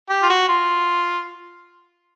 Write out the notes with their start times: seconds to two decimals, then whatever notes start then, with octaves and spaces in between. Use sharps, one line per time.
0.09 G4
0.23 F4
0.30 F#4
0.49 F4